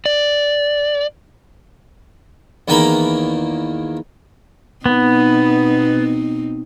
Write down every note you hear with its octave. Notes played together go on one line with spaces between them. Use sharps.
D5
E2 D#3 A#3 G5 A#5 B5
B2 B3 C4 D#4